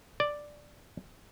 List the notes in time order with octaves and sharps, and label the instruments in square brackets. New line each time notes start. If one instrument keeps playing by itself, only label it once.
[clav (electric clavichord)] D5